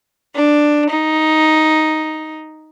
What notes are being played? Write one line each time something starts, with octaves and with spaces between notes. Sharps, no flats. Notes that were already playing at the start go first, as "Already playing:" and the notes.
D4
D#4